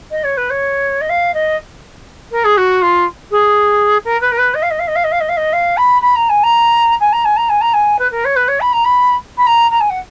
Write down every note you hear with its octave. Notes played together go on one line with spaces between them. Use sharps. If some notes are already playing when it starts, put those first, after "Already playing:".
D#5
C#5
B4
C#5
D#5
F5
D#5
A#4
G#4
F#4
F4
G#4
A#4
B4
A#4
B4
D#5
F5
D#5
F5
D#5
F5
D#5
F5
D#5
F5
D#5
F5
B5
B5
A#5
G#5
A#5
G#5
A#5
G#5
A#5
G#5
A#5
G#5
B4
A#4
C#5
B4
C#5
B5
A#5
B5
B5
A#5
A#5
G#5
F#5